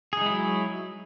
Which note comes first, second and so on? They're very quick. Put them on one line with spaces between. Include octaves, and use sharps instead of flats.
G#4 D#4 G#3 E4 F#3